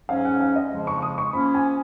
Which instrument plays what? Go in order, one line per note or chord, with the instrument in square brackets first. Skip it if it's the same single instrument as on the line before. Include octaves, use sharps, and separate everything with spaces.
[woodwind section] G#2 F#3 C#4 [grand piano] F5
[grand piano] F#5
F5
D#5
[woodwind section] F2 C#3 F3 G#3
[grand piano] C#6
D#6
C#6
[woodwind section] F3 A#3 C#4 [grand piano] B5
[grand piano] G#5